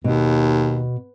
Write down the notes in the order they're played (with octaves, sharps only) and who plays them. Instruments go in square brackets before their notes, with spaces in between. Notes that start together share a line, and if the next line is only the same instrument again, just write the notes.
[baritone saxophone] D#2 [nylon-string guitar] B2